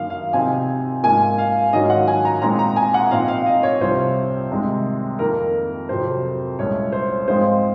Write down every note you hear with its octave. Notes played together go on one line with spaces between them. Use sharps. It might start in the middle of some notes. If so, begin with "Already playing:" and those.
Already playing: F#2 D#3 A#3 F5
F5
C3 F3 C4 D#4 G#5
G#2 F3 A#3 F4 G#5
F5
G#2 D#3 F#3 C#4 F4 D#5
F#5
G#5
A#5
A#2 G#3 C4 D#4 A#5
A#5
G#5
F#5
A#2 F3 C4 D#4 F5
F5
D#5
C#5
C2 C3 F3 C5
C2 C3 D#3 G#3 D#4
F2 D#3 A#3 A#4
F2 C3 F#3 C5
C2 A#2 G#3 C#4 C#5
C5
G#2 F3 G#3 C4 F4 C5